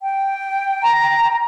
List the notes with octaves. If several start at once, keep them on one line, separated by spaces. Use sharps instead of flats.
G5
A#5